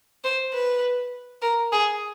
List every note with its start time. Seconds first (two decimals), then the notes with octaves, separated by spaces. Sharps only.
0.24 C5
0.54 B4
1.42 A#4
1.72 G#4